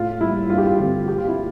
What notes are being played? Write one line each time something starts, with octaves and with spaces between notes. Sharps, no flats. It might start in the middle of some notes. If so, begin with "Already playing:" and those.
Already playing: A2 F4
G3 A#3 E4
G2 F4
G4
F4
D3 A3 C4 F4
A#2 G4
F4
E4